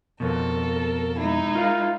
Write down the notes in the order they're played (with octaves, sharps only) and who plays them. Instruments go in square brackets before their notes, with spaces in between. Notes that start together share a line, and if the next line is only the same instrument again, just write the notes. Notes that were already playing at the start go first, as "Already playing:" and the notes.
[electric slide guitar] F2 B2 [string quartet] A4 A#4
[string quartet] G#3 D#4 E4
[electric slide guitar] F4 A#4 F5